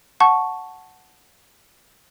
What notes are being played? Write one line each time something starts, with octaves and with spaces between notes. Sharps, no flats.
F#5 A5 C#6